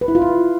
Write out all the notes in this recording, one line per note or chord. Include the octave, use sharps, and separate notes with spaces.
B4
E4
F4
E4